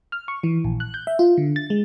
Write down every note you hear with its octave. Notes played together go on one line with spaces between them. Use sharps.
F6
C#6
E3
A#1
F#6
G6
E5
F4
D3
A6
G#3